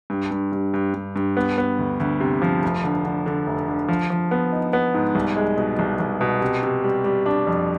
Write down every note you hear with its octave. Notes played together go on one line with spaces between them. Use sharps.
G2
G2
G2
G2
G2
G2
B3
B3
D2
D2
C3
F3
F1
D3
D3
D3
F1
D3
F3
F3
B3
D#4
B3
G#2
C2
G#3
B2
C2
C2
B2
C3
C3
G3
G3
D4
F2